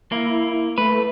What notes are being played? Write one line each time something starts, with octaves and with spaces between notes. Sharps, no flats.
A#3 E4
A3 B4